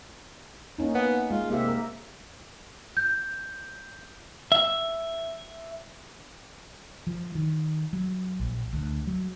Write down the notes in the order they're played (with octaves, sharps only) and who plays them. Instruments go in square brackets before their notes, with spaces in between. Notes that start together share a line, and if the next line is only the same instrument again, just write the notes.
[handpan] A#3 C#4 D#4
[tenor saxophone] B3
[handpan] G#3 [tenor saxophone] F4
[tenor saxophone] C3 [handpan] A#3 G4 E5
[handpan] A#3 A#4
[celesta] G6
[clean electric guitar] E5
[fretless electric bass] F3
D#3
F#3
A#1
D2
F#3